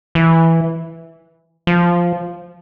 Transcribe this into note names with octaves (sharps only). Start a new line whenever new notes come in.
E3
F3